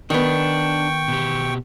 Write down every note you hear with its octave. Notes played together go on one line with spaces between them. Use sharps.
D#3 B3 D4 G5 C#6
B2 G4